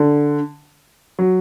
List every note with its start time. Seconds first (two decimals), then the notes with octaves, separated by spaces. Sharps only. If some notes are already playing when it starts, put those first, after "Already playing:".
Already playing: D3
1.19 F#3